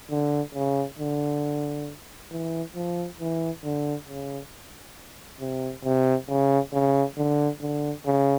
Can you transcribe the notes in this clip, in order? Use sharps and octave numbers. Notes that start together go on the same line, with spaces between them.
D3
C#3
D3
E3
F3
E3
D3
C#3
C3
C3
C#3
C#3
D3
D3
C#3